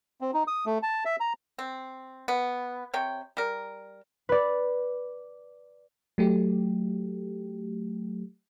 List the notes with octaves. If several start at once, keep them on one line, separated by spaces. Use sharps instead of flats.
C4
D#4
D#6
A3
A5
E5
A#5
C4
B3
C3 C#5 G5
G3 A#4
B4 D5
F#3 A3 G4